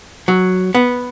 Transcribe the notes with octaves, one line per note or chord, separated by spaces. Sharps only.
F#3
B3